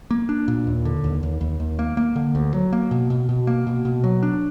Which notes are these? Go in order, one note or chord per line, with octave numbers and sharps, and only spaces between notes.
A#3
D4
A#2
D#2
D3
D#2
D#2
D#2
D#2
A#3
A#3
D3
D2
F#3
A#3
B2
B2
B2
A#3
B2
B2
F#3
D4